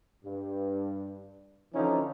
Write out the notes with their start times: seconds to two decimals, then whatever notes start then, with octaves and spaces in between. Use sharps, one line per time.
0.24 G2
1.74 D3 E3 F3 C#4 D#4